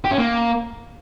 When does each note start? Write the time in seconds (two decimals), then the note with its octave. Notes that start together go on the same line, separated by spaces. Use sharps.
0.05 G4
0.11 C#4
0.18 A#3